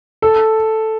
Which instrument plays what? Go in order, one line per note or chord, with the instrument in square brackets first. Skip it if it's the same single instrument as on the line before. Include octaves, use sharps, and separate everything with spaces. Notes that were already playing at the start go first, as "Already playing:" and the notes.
[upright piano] A4